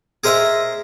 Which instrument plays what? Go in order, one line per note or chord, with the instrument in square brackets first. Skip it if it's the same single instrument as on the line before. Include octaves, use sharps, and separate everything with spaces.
[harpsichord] G#4 A#4 C5 D#5 E5